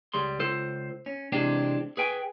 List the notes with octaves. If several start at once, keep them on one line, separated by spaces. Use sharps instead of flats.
C#2 G3 G#4 C6
C#2 F4 A4 C5
C#4
C3 E3 G#3 C4 D4 G4
G#4 B4 G5 G#5